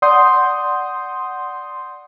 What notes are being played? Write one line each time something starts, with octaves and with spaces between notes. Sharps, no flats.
D5 F#5 C6 D#6 G6